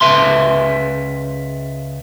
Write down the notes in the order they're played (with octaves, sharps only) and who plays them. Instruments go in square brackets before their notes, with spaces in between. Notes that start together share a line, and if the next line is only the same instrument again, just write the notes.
[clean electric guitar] C#2 B4 E5 C6